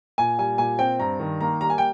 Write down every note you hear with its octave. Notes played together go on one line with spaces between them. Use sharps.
A#2 G#5
G3 G#5
A#2 G#5
C4 G5
G2 A#5
D#3
A#3 A#5
G3 A#5
G#5
G5